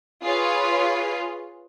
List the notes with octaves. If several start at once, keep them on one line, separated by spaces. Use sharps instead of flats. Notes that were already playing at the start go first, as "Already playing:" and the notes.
F4 G#4 B4 C#5